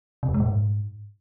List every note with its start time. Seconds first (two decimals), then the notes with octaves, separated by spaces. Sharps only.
0.23 C3
0.29 F2
0.34 G#3
0.40 A#2
0.46 G#2